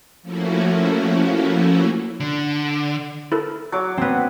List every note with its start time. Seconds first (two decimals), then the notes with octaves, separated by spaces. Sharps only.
0.22 F3 A3 A#3 C#4 E4 F#4
2.20 D3
3.32 E4 A4 A#4
3.72 F#3 D6
3.98 B3 C4